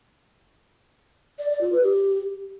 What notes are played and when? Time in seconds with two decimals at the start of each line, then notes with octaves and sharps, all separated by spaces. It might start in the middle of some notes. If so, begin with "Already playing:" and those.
1.39 D5
1.50 D5
1.61 F4
1.72 B4
1.83 G4